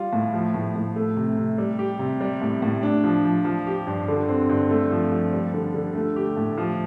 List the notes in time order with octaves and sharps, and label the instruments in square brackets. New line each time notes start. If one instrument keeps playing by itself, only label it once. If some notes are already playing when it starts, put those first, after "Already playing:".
Already playing: [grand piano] G3 F4
A2
F3
A2
A2
A3
C3
C3
G3
G4
C3
G3
A2
A2
D4
F3
F3
F3
G4
G2
D3
C4
G2
A3
F3
F3
G3
D3
D3
A3
G4
A2
F3